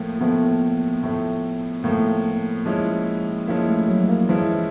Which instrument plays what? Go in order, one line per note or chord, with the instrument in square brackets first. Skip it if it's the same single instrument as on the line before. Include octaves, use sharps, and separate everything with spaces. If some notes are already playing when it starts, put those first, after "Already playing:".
Already playing: [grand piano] A2 F3 A3 [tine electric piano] A#3
[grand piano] A2 F3 A3 [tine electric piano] B3
[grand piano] A2 F3 A3
[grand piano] A2 F3 A3 [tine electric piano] A#3
[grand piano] F3 G#3 C#4 E4
[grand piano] F3 G#3 C#4 E4 [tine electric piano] A#3
[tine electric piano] A3
F#3
A#3
[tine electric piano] E3 [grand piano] F3 G#3 C#4 E4